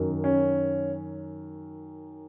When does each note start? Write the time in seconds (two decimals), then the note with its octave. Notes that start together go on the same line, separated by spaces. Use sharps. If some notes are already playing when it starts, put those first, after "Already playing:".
Already playing: F#2 D#3
0.24 C#4